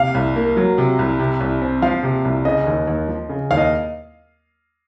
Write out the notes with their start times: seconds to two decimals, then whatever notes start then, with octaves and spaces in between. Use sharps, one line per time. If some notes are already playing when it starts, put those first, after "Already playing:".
Already playing: C3 F5
0.15 C2
0.36 A#3
0.57 F#3
0.78 C3
0.99 C2
1.19 C3
1.40 C2
1.61 C4
1.82 F3 F5
2.03 C3
2.25 C2
2.45 C#3 D#5
2.66 D#2
2.87 D#2
3.08 F3
3.29 C#3
3.51 D#2 F5
3.58 D#5